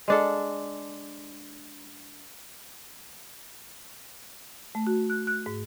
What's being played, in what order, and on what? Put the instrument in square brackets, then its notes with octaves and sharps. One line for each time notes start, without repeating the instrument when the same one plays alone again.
[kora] G#3 D4 A4
[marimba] A3
F#4
F#6
F#6
G#2